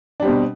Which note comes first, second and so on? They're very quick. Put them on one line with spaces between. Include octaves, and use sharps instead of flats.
D4 G3 C4 B2